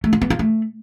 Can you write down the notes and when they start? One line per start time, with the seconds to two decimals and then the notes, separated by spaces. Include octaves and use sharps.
0.04 A3
0.13 F4
0.22 B3
0.30 F4
0.39 A3